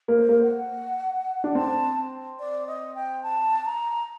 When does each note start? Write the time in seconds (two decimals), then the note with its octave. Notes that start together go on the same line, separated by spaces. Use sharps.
0.08 A#3
0.15 C5
0.29 A#3
0.42 F#5
1.44 D4
1.55 C4 A5
2.40 D5
2.67 D#5
2.95 G5
3.23 A5
3.66 A#5